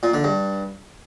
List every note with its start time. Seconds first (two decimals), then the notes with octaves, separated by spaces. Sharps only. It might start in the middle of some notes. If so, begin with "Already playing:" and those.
0.03 A#2
0.14 D3
0.24 G2